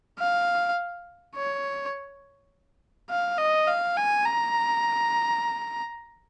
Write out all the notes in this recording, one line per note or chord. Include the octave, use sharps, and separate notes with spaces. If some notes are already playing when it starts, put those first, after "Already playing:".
F5
C#5
F5
D#5
F5
G#5
A#5